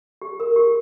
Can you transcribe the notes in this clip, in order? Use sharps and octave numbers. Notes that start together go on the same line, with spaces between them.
G4
A#4
G4